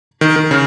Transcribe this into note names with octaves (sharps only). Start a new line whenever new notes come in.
D#3
D#3
C#3